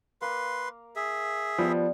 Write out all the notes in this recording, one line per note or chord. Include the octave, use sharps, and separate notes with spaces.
A#3 B4 A#5 C6
G#4 E5
F3 G3 B3